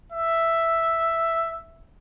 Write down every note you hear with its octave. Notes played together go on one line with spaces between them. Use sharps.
E5